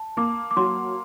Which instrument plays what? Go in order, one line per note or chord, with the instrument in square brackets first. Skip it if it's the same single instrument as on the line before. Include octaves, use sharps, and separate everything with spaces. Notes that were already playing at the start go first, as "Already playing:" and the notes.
Already playing: [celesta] A5
[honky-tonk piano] A#3 [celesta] D6
[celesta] D6
[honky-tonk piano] F#3 [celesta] C6